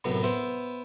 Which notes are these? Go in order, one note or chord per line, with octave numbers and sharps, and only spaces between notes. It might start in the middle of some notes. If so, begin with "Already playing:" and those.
C2 F#2 A2 B3
B3 E4 C5